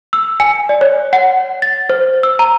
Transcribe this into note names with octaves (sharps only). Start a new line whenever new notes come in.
E6
G#5
D5
C#5
F#5
A6
C5
E6
A#5